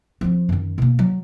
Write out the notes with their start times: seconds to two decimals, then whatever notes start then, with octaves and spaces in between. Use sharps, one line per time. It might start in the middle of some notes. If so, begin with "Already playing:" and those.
0.21 F3 C4
0.49 F#2 D#3
0.78 B2 A#3
0.99 F#3